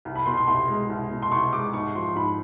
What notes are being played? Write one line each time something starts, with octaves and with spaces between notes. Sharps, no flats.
C2
B5
B2 C6
C6
C2 C6
G#3
C2
B2
C6
C2 C#6
G#3 D6
G#2 C#6
F3 C6
G#2 B5